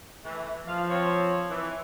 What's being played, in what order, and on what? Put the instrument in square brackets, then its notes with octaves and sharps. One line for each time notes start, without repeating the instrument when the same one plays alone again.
[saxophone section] E3 A3
[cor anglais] F3 [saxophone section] F5
[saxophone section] C4 C#5
E3